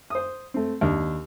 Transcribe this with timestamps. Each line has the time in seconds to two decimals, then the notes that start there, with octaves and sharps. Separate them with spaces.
0.10 C5 D#6
0.54 A3 C4
0.81 D#2 D4